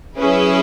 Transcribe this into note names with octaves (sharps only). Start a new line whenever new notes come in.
F#3 C#4 E4 G#4 B4